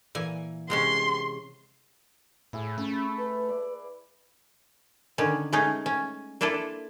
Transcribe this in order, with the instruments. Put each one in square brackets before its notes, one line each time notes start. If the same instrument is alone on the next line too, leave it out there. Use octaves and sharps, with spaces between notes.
[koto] A#2 E3 G#5
[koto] C3 G#3 C#4 [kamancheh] C6
[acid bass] A2 [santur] E4 G#4
[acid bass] A3 [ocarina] C#4 [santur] B5
[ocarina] B4
[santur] D5
[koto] D3 D#3 C#4
G#3 A3 C#4 D#4
C#4
A#3 D4 E4 F4 A4